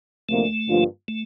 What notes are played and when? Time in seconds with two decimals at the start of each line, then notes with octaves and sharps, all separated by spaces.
0.29 D2 C3 F3 A3 A#3
0.68 G2 D3 F3 A#3 F4
1.08 A3